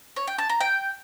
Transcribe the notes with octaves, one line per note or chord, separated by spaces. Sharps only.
C#5
G5
A5
A#5
G5